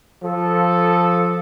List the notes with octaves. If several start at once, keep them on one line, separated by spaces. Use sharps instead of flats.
F3 A4